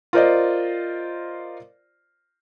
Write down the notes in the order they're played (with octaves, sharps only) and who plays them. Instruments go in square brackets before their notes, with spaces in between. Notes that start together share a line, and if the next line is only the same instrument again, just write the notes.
[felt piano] F4 A#4 C5 D5 D#5